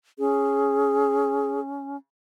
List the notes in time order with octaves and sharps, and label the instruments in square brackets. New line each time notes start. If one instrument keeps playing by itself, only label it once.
[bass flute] C#4 [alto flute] G#4